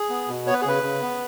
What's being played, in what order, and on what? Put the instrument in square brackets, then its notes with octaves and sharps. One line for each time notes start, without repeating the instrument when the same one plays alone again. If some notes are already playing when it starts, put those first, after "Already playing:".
Already playing: [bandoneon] G#4
B3
B2
B3 C#5
B4
G#4
C#3 B4
C#3
B3